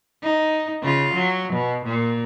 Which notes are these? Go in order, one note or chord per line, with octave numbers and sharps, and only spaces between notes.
D#4
C#3 F4
F#3
B2
A#2